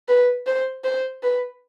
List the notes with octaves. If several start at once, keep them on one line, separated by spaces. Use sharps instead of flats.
B4
C5
C5
B4